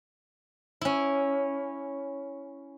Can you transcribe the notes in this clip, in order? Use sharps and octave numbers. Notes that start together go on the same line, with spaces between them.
C#4 E4